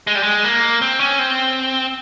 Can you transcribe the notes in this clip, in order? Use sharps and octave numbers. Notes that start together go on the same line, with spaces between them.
G#3
G3
G#3
A#3
C4
C#4
C4